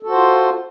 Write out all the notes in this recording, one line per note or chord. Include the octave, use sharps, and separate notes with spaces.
F4 F#4 A4 C5